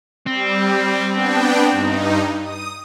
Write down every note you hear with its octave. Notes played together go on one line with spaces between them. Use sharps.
G3 C4
B3 D4 G5
G2 D#4
D#6